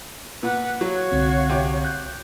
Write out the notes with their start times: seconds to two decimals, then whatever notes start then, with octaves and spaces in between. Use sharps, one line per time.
0.43 A#2 B4 F#5
0.81 F#3 F#4 C#5 F5 F#5
1.12 C2 D3 C4
1.50 C3
1.85 F#6 G6